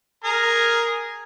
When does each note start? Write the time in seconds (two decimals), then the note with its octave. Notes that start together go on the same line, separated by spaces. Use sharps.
0.24 G#4 A#4 A#5